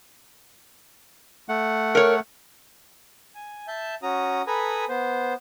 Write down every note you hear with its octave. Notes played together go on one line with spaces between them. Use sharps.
A3 F#5
A#4 C#5
G#5
E5 A5 G6
C#4 F#4 A#5 D#6
A4 B4 G#5 A#5 B5 D#6
B3 C5